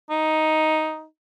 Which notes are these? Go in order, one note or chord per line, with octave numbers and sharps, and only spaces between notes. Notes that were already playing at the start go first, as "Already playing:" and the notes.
D#4